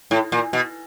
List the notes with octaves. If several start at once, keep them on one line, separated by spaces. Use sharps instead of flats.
A2
A#2
B2